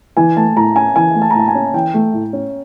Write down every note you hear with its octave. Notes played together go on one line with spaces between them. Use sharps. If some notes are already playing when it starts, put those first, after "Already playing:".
E3 G#5
A3 A5
A2 A#5
C#4 G#5
E3 G#5
A3
A5
A#5
A2 A5
G#5
C#4
E3 G5
A3
A2
C#4